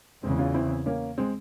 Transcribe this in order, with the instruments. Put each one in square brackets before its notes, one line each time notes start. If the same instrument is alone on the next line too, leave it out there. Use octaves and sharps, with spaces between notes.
[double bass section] E2 C#3 E3 [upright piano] G#3 C4
[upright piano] C#4 F4
C4 E4
A#3 C#4
G#3 C4